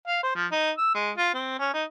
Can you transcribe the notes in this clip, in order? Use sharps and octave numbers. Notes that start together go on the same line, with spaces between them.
F5
C5
F3
D#4
E6
G#3
F4
C4
C#4
D#4